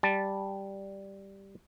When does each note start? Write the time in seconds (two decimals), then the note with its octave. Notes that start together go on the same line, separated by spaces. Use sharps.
0.03 G3 A5